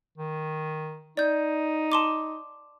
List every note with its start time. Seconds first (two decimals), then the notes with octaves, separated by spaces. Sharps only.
0.18 D#3
1.17 D#4 D5 G6
1.92 A5 C6 D6